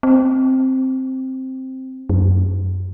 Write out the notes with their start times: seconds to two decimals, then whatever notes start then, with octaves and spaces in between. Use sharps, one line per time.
0.03 C4
2.10 F#2